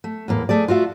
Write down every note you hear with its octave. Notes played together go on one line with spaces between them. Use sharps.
A3
E2 A2 A#3
A3 G#4 D5
F4 F#4 E5 F5